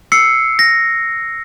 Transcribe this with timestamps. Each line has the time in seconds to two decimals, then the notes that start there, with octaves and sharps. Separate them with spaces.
0.12 E6 C7 C#7
0.59 A#6